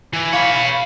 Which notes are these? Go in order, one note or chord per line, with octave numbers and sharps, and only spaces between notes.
E3
C#5 F5 B5